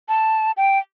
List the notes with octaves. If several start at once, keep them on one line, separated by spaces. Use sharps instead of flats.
A5
G5